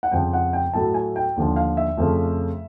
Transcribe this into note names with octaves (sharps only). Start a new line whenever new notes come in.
F#5
F2 C#3 F3 G5
F#5
G5
A2 F#3 A3 A5
G#5
G5
D#2 D3 F3
F5
E5
F2 C#3 F3 A3